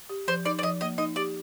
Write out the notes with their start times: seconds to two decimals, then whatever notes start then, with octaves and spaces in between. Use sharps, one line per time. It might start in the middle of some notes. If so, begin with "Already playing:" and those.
0.10 G4
0.28 F3 C5
0.45 D#4 D5
0.59 D5
0.63 F3 D#5
0.81 A#3 D#5
0.98 D#4 D#5
1.16 G4 D5